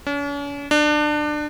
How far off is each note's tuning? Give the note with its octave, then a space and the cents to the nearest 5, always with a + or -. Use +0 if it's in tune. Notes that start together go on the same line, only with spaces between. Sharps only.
C#4 +45
D4 +25